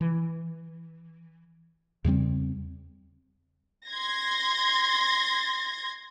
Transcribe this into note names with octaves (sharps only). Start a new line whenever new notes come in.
E3
E2 C#3 G3 C4
C6 G#6 A#6